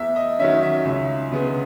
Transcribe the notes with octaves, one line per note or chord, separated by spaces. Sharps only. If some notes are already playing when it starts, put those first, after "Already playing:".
Already playing: E2 E5
D#5
D#3 F#3 C#4 E5
E5
C#2
C#3 G#3 B3